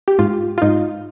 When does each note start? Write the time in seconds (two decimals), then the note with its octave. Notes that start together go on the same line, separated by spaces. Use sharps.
0.08 G4
0.19 G#2 F4
0.58 F4
0.62 G#2 D#4